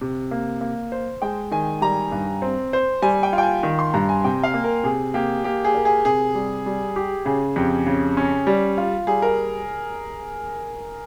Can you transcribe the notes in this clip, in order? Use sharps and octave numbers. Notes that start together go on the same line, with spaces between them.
C3
A#3
A#3
C5
G#3 G5
D#3 G#5
G3 A#5
G2
C4
C5
G3 G#5
G5
F4
G5
G#5
D#3
C6
G2 A#5
G#5
C3 G5
F5
A#3
A#4
C3 G#4
A#3 G4
A#3 G4
G#4
A#4
G#4
C3 G#4
G3
G3
G4
C#3 G#4
F2 G4
C#3
C#4
G3
F4
G3 G#4
A#4